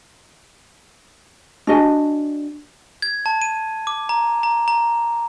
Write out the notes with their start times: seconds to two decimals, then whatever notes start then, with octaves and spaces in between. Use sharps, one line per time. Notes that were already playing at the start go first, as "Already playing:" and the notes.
1.67 D4 F#4 D#5 G#5
3.02 G#6
3.26 A5
3.42 D#7
3.87 D6
4.09 A#5
4.43 A#5
4.68 A#5